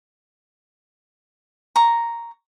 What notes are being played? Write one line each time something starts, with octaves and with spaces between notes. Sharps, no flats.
A#5 C#6